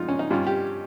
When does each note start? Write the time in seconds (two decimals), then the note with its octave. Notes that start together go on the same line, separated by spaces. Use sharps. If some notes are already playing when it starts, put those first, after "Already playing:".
Already playing: F2 G#3 D#4 F4
0.08 C#4
0.19 D#4
0.30 G2 G3 C#4 F4
0.47 G4